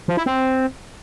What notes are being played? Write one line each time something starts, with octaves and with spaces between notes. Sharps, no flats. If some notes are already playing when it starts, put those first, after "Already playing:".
F3
E4
C4